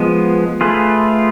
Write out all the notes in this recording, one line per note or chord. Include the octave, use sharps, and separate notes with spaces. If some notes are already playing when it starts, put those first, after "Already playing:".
Already playing: F3 G#3 B3
A3 F4 G#4 B4